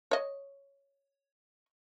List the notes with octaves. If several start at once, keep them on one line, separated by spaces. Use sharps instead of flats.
C#5 D#5